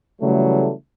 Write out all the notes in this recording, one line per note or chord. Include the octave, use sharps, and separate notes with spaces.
C#3 E3 F#3 G3 A3